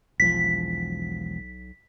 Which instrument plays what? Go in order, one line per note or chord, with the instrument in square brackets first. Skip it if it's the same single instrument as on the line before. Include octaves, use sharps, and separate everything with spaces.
[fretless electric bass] E1 F3 [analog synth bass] B1 [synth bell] B6